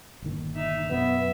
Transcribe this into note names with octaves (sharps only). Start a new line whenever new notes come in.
G1 A#2 D#3
D#4 E5
F#2 B2 B3 E5